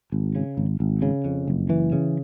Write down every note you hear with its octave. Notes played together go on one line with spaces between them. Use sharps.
G#1
C#3
G#1
G#1
C#3
F2
F#1
E3
C#3